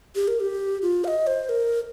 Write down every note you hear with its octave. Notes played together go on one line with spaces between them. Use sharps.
G4
A#4
G4
F4
F5
D#5
C5
A#4